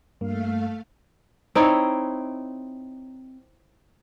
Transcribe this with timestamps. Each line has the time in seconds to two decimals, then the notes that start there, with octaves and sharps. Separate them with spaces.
0.21 G2 A3 A#3 F5
1.55 C4 D#4 E4 C#5